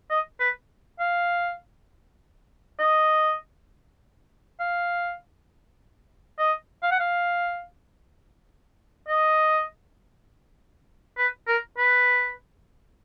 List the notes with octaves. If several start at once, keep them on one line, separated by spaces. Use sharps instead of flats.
D#5
B4
F5
D#5
F5
D#5
F5
F#5
F5
D#5
B4
A#4
B4